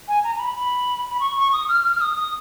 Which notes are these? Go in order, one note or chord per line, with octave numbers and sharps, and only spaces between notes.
G#5
A#5
A#5
B5
B5
B5
C#6
C#6
D#6
F6
F6
F6
D#6
D#6